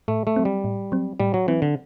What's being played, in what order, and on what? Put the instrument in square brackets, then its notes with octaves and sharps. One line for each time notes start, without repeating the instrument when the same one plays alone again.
[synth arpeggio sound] A2 [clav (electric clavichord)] A3
[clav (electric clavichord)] A3
[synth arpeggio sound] F#3 C4
[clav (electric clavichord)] G3
[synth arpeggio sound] A2
F#3 C4
[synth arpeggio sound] A2 [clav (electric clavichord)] G3
[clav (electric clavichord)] F#3
[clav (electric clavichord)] E3 [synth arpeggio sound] F#3 C4
[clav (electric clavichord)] D3